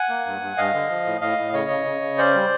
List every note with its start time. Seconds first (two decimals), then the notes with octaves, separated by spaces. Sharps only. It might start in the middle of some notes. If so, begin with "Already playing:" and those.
Already playing: F#5 G#5
0.09 A#3
0.26 G2
0.42 G2
0.57 G2 D#5 F5
0.74 D3
0.89 F3
1.06 A2
1.21 A2 D#5 F5
1.38 A2
1.53 C#3 C#5 D#5
1.70 C#3
1.85 C#3
2.02 C#3
2.18 C#4 C5 D5
2.34 G3